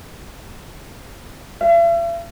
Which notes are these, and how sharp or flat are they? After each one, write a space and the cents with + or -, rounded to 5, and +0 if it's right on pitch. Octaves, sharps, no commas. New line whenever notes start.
E5 +45